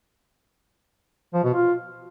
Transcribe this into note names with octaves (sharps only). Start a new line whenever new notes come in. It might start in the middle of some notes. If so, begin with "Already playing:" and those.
F3
B2
F4